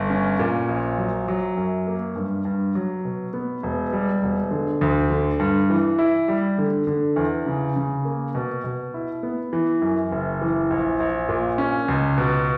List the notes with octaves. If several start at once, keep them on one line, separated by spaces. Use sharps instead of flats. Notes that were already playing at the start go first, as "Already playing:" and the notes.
Already playing: G1
C#4
A#2
A#1
F#3
F#3
F#2
A#3
G2
G2
F#3
B2
B3
E1
G3
E1
D3
D2
D3
G2
E3
E4
G3
D3
D3
E2
C#3
C#3
A#3
B2
B2
E4
B3
E3
F#2
F#1
E3
A#1
A#1
A#2
C#4
C#2
B2